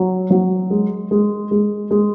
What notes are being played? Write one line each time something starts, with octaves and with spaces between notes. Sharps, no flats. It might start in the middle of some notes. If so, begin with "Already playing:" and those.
Already playing: F#3
F#3
G#3
G#3
G#3
G#3